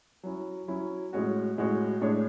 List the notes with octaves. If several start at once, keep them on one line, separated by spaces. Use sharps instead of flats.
F#3 C#4 E4
F#3 C#4 E4
A2 G#3 C#4 F#4
A2 G#3 C#4 F#4
A2 G#3 D4 G#4 C#5